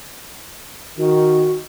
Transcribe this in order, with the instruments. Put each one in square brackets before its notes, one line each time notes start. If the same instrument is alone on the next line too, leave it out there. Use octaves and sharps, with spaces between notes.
[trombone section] D#3 [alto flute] F#4